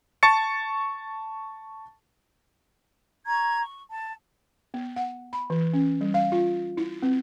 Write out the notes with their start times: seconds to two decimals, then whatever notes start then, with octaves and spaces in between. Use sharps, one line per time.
0.23 A5 C#6 A6 C#7
3.26 A#5 C#6 G#6
3.61 C#6
3.90 A5
4.74 B3
4.96 F#5
5.33 B5
5.50 E3
5.73 C#4
6.01 G3
6.14 F5
6.32 F4
6.77 E4
7.02 C4